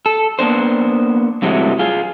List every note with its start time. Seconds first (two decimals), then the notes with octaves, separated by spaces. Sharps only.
0.06 A4
0.39 A#3 B3 D4 C5
1.42 G2 C3 E3 F#3 G#3 A3
1.79 F4 G#4